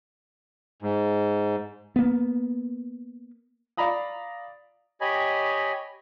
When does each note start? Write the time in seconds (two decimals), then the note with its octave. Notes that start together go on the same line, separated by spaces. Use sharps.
0.82 G#2
1.96 A#3 B3
3.77 D5 F5 A#5 B5 D#6
5.01 G4 C#5 D#5 G#5 B5